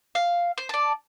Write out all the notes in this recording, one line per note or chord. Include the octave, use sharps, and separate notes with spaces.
F5
C5
D5 A5